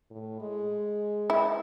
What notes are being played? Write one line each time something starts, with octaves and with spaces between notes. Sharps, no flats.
A2
G#3
E4